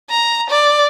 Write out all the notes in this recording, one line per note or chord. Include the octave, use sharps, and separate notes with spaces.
A#5
D5